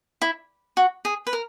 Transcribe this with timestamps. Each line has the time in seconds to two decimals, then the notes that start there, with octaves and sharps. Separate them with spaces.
0.22 E4
0.77 F#4
1.05 G#4
1.27 B4
1.33 A#4